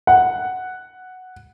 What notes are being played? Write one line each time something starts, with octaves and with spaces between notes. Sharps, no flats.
F#5